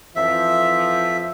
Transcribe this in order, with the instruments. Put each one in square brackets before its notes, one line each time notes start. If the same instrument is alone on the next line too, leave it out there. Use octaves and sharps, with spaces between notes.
[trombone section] F2 E3 F3 [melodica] E5